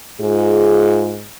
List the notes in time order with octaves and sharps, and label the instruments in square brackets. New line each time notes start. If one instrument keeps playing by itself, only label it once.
[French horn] G#2 [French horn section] F4 G#4